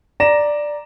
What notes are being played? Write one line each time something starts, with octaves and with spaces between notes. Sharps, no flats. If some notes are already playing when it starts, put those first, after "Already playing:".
D5 A#5 A#6 E7